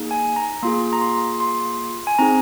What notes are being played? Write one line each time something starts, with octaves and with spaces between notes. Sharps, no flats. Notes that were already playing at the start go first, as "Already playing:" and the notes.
Already playing: A#3 D#4 G#4
G#5
A#5
A#3 F4 G#4 C6
A#5
C6
C6
G#5
C4 D#4 G#4 A#5